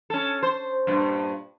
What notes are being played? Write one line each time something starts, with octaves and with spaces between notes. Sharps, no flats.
C#4 A4
C5
G2 A#2